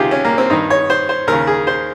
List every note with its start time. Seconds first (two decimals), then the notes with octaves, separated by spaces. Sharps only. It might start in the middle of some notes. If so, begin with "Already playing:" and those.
Already playing: C#2 C3 D#3 F4 G4 G#4
0.11 C#4
0.25 A#3
0.38 C4
0.50 G2 D#3 D#4
0.70 C#5
0.90 C5
1.09 C5
1.27 D#2 C#3 A#4
1.47 G#4
1.67 C5